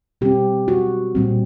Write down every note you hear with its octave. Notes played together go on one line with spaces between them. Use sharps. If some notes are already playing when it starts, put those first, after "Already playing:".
B2 G3 C4 G4
F#4
A#2 G3 C4